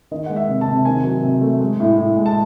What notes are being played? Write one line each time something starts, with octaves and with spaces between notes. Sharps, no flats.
D#3 D#5
G#3 F#5
E5
C3
A5
C3
D#3 G#5
F#3
C3
A3
G#3
A2
A2
G#3
A5